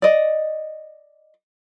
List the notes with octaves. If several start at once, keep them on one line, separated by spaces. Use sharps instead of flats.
D5 D#5